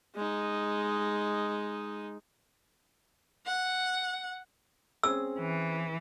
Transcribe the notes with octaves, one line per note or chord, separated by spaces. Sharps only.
G#3 D#4
F#5
C4 C#4 G#4 E6
E3